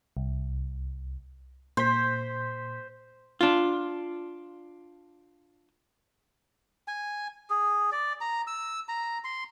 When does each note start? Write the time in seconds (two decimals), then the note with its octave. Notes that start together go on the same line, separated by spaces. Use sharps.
0.17 C2
1.77 A#2 C5 B6
3.41 D4 F4
6.88 G#5
7.50 G#4
7.92 D5
8.21 A#5
8.47 E6
8.89 A#5
9.24 C6